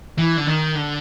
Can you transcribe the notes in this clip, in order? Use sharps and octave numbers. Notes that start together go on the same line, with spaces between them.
E3
D3
D#3
D3